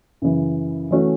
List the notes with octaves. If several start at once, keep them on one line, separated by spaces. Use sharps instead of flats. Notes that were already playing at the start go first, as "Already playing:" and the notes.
F#2 C#3 E3
E3 A3 C#4 F#4